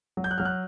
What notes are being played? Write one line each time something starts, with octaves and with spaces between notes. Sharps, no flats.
F#3
G6
F#6
F#3 F6
F#6